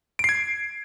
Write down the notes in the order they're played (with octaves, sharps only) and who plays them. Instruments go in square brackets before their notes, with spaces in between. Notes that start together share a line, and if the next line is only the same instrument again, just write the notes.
[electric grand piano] D7
C7
G#6